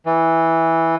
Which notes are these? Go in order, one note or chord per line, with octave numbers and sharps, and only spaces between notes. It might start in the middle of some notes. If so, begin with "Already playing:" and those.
E3